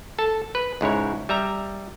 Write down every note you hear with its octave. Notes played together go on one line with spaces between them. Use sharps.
A4 A5
B4
C#2 G#2 E4 C#5
G3 E5 A#5